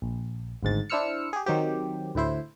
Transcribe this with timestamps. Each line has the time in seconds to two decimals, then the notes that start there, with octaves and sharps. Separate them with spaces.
0.02 A#1
0.63 G#1 D2 G#2 A6
0.90 D4 E4 C5 E6 F6 C#7
1.33 G4 G#4
1.46 D#3 F#3 C4 G4
2.15 D2 A2 E4 C5